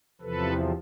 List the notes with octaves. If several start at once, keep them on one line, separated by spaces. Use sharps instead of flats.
E2 C3 F3 A4 B4